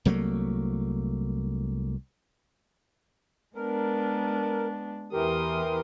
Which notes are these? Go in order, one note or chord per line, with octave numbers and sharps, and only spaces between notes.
C2 F#3 A3 A#3
G#3 B3 D4 A#4
E2 E3 G4 A#4 C6 D#6